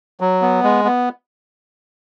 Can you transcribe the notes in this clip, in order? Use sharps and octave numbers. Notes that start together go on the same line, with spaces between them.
F#3
B3
G#3
B3